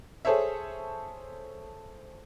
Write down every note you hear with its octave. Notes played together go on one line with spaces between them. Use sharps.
G#4 A4 C5 C#5 E5